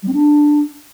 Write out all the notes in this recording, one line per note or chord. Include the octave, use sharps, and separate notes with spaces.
G3
C4
D4